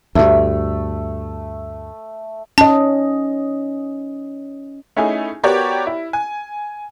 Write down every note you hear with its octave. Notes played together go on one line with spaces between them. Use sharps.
D2 G2 A3
C#4 D#5 A5
A3 C#4 D#4 E4 G#4 G#5
B3 F#4 G4 A#4 C#5 D5
E4
G#5